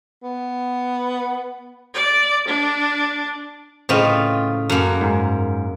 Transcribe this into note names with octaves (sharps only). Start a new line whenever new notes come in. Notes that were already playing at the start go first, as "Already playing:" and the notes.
B3
D5
D4
A2 C#3 C4 F4 B4 D#5
F#2 A#3 A4
G#2